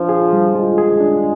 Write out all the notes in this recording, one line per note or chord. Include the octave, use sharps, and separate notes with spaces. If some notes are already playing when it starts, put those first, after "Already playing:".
Already playing: F3 D4
G#4
G3
G#3 F4
G#4
D4